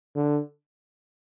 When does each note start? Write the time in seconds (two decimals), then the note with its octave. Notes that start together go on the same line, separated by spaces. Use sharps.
0.15 D3